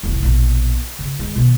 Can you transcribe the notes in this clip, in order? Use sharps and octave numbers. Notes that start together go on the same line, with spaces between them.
F1 C2
A#1 B2
C#3
D#3 G#3
B2 D#3